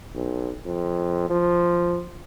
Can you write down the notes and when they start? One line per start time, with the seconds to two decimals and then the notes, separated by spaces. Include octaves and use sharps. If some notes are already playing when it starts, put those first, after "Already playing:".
0.15 B1
0.66 F2
1.30 F3